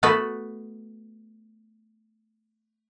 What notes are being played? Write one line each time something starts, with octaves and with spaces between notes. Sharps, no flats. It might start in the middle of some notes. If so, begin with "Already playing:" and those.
A3 B3 F#4 A4 B4